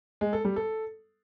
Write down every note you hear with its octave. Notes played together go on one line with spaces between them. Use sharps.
G#3
A4
G3
A4